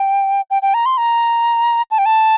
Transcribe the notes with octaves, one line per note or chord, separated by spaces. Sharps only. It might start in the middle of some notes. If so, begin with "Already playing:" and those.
Already playing: G5
G5
G5
A#5
C6
A#5
A5
G5
A5